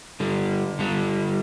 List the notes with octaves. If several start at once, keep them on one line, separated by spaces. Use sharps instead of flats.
D3 G3
D3 G3